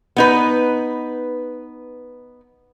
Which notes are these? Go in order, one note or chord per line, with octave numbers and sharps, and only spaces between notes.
B3 D#4 B4